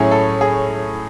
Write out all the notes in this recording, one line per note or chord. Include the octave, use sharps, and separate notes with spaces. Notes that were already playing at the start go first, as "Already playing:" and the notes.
Already playing: A2 F#3 C#4 E4 G#4
A4
G#4